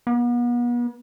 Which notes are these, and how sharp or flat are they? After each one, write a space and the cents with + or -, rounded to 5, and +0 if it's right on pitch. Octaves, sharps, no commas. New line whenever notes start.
B3 -40